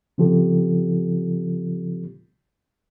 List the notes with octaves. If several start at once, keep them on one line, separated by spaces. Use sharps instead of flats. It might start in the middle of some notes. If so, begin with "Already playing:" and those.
C#3 F3 C4 F4 G4 A4